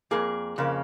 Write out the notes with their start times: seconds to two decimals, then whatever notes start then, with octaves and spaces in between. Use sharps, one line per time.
0.11 F2 C#3 A#3 G#4
0.58 F2 C#3 A#3